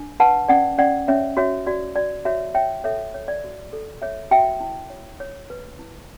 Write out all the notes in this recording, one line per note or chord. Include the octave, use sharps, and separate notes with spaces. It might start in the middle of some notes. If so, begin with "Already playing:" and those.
Already playing: D4
B4 F#5 A5
C#4 D5 F#5
C#4 D5 F#5
C#4 C#5 E5
F#4 C#5 E5
F#4 D5
F#4 D5
F#4 C#5 E5
C#5 E5 G5
A4 C#5 E5
C#5
D5
F#4
A4
C#5 E5
F#4 E5 G5
E4
C#5
C#5
B4
E4